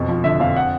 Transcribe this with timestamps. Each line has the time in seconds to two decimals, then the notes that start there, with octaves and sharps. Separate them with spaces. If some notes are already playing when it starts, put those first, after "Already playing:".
Already playing: F2 B2
0.08 F3
0.24 D3 E5
0.40 F2 F5
0.56 F#5